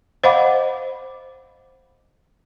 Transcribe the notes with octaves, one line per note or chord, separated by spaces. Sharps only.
C5 D#5 F5 F#5 B5 D6